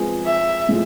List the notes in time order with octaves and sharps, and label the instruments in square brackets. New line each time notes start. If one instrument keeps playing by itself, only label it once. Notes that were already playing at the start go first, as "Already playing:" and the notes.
Already playing: [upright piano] F3 G#3 C4 G#4 B4
[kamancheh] E5
[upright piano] A2 F3 G#3